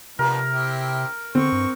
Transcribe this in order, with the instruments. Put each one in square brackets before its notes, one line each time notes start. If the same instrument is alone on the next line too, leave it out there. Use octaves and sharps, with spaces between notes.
[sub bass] C3 [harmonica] F3 B3 D4 [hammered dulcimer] A#4
[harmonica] C4 E4 G4
[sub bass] D3 [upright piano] C4 [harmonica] C#6
[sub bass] G2